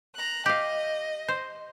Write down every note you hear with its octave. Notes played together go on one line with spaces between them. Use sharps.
A#5 F#6
G4 D#5 F5
C5